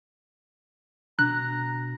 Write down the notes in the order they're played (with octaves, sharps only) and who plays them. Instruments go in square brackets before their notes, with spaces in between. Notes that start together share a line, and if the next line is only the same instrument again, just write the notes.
[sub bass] B2 [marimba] D4 [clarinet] A#5 [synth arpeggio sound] F#6